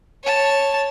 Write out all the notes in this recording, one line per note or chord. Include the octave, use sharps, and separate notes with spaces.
C#5 A5